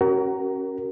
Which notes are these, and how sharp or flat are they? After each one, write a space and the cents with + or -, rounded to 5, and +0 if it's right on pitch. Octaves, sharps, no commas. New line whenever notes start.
C#4 -10 F#4 +35 A#4 +0